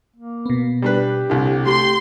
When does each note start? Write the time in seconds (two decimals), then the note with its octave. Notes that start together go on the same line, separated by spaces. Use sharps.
0.16 A#3
0.46 B2 B3
0.82 G3 D4 G4 B4
1.30 C2 D3
1.66 A3 G4 C6